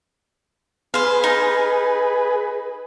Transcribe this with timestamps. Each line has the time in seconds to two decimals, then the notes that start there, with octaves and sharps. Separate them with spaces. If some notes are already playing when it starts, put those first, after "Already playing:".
0.94 G#4 B4 C5 F5
1.24 D#4